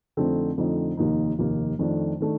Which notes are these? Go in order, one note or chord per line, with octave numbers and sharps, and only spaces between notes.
F2 D3 A3 C4 D#4
F2 D3 A3 C4 D#4
F1 D#2 D#3 A#3 D#4
F1 D#2 D#3 A#3 D#4
F2 D#3 A3 D4
D#3 A3 D4